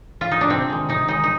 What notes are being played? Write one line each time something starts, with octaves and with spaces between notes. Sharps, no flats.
F4
D#4
D4
C3 C4
D#3 G#3
C3 D#4
D#3 G#3 D#4
D#4